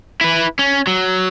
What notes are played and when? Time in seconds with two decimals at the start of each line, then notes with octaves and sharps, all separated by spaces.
0.21 E4 B4
0.59 C#4
0.87 F#3